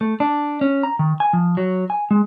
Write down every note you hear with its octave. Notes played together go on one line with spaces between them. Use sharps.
A3
D4
C#4
A#5
D#3
G#5
F3
F#3
G#5
G#3